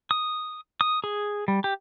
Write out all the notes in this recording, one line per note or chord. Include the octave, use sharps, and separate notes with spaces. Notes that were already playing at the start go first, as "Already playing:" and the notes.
D#6
D#6
G#4
G3
G4